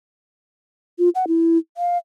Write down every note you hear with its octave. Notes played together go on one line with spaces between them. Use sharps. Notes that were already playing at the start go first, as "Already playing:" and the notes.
F4
F#5
E4
F5